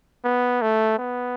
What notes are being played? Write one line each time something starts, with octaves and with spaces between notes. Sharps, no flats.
B3
A3
B3